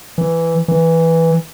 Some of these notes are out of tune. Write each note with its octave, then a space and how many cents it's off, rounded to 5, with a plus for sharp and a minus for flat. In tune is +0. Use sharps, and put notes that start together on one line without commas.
E3 +5
E3 -5